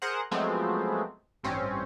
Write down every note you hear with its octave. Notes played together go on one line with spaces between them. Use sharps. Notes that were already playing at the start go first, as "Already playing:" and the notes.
G#4 A#4 C5 F#5
F3 F#3 G#3 A3 B3 C4
A1 G2 C4 C#4